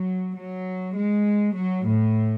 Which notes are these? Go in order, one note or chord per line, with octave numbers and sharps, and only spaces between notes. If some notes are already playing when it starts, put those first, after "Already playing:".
Already playing: F#3
F#3
G#3
F#3
A2